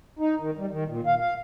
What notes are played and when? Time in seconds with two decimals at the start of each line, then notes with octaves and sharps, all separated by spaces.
0.19 D#4
0.40 D#3
0.57 G3
0.71 D#3
0.88 A#2
1.06 F5
1.20 F5